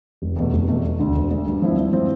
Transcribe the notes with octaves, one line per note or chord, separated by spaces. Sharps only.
F1
E2 B2 A3
F1
E2 B2 A3
E1
D2 D3
E1
D2 D3
G2
F3 C4 E4
G2
F3 C4 E4